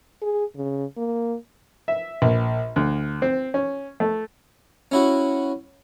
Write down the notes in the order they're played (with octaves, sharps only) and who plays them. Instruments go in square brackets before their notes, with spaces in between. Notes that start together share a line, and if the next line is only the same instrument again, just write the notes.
[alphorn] G#4
C#3
A#3
[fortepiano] E5
A#1
D2
C4
C#4
A3
[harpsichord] C#4 E4 F#4